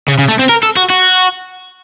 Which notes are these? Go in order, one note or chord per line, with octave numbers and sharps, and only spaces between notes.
C#3
C#3
A3
C4
A#4
A4
F#4
F#4